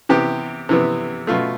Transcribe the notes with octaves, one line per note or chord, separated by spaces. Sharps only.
C3 E3 B3 G4
C3 E3 B3
B2 A3 F4